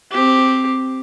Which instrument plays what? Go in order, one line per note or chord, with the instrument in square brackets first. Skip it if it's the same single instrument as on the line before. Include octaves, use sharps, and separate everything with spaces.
[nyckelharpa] C4 G4